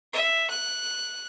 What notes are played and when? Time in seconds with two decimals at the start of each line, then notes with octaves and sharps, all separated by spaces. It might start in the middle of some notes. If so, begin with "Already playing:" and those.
0.13 E5
0.50 F#6